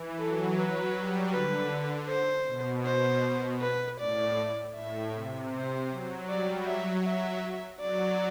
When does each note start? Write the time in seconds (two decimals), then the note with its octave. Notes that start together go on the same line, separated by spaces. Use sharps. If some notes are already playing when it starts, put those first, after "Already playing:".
Already playing: E3
0.18 F#3 A4
0.57 F#3 B4
0.95 G3
1.33 D3 B4
2.09 C5
2.47 B2
2.85 B2 C5
3.61 B4
4.00 A2 D5
4.76 A2 E5
5.14 C3
5.53 C5
5.90 F#3
6.28 G3 D5
6.67 F#3 E5
7.05 E5
7.81 F#3 D5